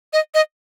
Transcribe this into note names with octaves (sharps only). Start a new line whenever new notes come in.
D#5
D#5